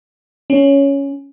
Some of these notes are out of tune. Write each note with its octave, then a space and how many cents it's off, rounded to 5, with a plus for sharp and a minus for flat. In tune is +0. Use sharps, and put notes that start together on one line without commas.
C#4 +5